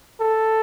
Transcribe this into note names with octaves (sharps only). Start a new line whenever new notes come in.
A4